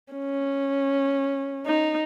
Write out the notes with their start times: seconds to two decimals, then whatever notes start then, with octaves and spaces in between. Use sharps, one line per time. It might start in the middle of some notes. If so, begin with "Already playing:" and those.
0.13 C#4
1.66 D#4